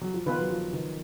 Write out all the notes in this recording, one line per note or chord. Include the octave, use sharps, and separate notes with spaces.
F#3
F3
D#3 B3 F4 B4
F#3
F3
D#3